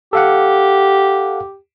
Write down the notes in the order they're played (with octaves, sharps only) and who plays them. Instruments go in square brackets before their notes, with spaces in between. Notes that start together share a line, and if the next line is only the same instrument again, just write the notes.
[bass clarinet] G4 [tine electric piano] A4 F5 F#5